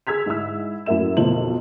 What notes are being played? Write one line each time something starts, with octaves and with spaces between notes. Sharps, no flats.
G#4 E6 G#6 B6 F7
G#2 G#3 E4 E6
F#2 A2 A#3 E5 E7
B1 F2 A#3 C5 F#7